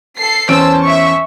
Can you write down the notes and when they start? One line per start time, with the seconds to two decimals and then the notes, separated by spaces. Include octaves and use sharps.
0.17 A4 C7
0.49 E2 C#4 C5 A5 E6 D7
0.83 E5 C#6